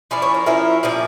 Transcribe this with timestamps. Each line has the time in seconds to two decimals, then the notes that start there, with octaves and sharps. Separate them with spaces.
0.11 F3 C#4 E4 D5
0.22 C#5
0.34 A#4
0.46 F3 C#4 E4 A#4
0.83 A#2 F3 C#4 D5